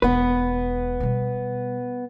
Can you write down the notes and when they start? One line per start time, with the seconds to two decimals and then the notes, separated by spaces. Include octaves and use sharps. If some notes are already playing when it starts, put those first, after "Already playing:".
0.02 E1 E2 B3 B4
1.00 B2 G3